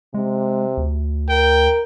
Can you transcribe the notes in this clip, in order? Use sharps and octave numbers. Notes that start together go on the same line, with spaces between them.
C3 G#3
D2
A#4 G5